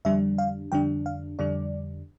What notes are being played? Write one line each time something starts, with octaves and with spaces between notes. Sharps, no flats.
F2 D3 G3 D4 E5
F5
F2 D3 G3 D4 G5
F5
F2 D3 G3 D4 D5